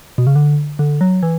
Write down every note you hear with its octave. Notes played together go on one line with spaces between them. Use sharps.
B2
C#3
D3
D3
F#3
E3